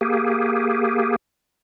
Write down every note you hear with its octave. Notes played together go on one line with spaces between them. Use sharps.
A#3 G4 G#4